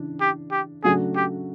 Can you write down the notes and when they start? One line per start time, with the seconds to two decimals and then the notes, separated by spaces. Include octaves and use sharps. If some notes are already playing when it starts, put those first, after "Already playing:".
Already playing: C#3 E3 D4
0.21 G4
0.52 G4
0.84 C#3 F#3 A3 D4 F#4 G#4
1.16 G4